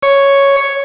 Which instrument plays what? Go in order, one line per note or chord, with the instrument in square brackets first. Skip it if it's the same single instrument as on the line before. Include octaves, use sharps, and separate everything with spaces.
[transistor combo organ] C#5